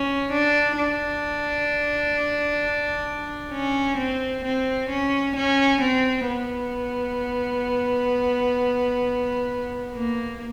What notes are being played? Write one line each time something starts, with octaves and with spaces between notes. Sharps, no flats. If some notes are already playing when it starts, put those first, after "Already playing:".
Already playing: C#4
D4
D4
C#4
C4
C4
C#4
C#4
C4
B3
A#3